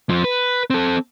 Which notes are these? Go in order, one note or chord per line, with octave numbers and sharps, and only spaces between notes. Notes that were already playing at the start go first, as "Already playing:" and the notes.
F2 F3
B4
C4 A4